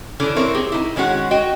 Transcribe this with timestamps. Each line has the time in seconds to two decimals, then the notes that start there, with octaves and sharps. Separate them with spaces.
0.20 D3 E3 C#4 D4
0.36 C4 E4 A#4 C#5
0.54 C4 G4 G#4
0.72 D#4 E4
0.96 D#3 G#3 C#4 F#4 F#5
1.31 F#4 D#5 G5